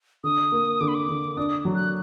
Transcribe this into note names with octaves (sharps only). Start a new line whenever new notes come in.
D3 D#6
A#3
D3 D6
B5
D6
D3
D4 D#6
F#3
F#6